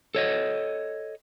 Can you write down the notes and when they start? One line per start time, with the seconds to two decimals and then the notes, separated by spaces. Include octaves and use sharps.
0.15 A4 C#5 D#5